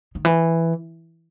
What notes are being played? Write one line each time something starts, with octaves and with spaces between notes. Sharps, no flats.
D#3
E3